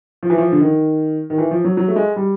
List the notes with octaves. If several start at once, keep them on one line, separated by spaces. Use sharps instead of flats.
F3
E3
F3
D3
D#3
D#3
E3
F3
F#3
F#3
A3
G#3
G3